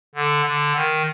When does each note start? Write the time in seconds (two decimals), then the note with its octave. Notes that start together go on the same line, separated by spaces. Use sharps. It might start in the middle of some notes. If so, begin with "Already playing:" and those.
0.15 D3
0.46 D3
0.75 D#3